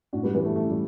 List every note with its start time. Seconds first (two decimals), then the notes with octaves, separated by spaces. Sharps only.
0.13 A2 D4 F#4
0.23 G3 B3
0.34 E3 G3 B3
0.45 A3
0.55 A2 A3
0.70 G3